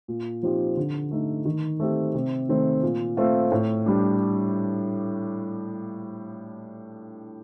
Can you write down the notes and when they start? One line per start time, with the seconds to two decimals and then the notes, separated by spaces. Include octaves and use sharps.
0.08 A#2
0.43 F3 C4 D#4 G4
0.77 D3
1.11 A3 D#4
1.45 D#3
1.80 A3 C4 G4
2.14 C3
2.49 D#3 A3 C4
2.82 A#2
3.17 A3 C4 F4
3.52 A2
3.86 G3 D4